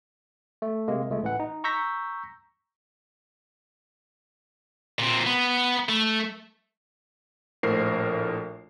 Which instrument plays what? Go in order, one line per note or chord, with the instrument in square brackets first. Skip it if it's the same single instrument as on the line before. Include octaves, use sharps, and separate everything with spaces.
[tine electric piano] A3
C3 G#3 A#3
C#2 G#3 A3
A1 E3 F#5
D#4
A#5 C#6 E6 G6 A#6 B6
[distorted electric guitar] A#2 C4
B3
A3
[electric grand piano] A#1 A2 A#4 C5 C7